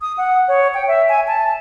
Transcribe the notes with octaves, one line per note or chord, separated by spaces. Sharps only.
D#6
F#5
C#5
G5
E5
G#5
A5